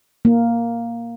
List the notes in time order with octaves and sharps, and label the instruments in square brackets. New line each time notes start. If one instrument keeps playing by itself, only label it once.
[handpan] A#3